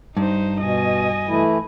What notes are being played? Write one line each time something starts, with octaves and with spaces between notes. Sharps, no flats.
G2 D#4 C5
B2 D#5 G#5
E3 A3 E4